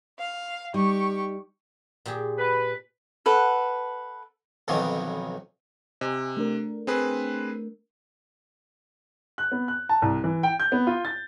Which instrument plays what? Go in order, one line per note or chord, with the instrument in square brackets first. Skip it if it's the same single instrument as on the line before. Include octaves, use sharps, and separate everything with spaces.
[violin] F5
[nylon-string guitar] G3 D#4 [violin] G4 C#6
[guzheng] A#2 G4 G#4
[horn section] B4
[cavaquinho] A4 B4 F#5
[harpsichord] B1 F2 B2 D#3 E3 F#3
[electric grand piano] C3 [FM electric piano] D#5 G#5
[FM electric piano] A3 D4 A#4
[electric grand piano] C4 G#4 B4
[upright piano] F#6
B3
F#6
A5
C2
E3
G5
G6
B3
F4
A6